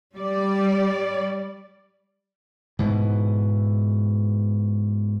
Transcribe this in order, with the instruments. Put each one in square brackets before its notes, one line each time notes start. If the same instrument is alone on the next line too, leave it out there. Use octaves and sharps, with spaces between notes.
[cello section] G3 D5
[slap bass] G#2 B2 E3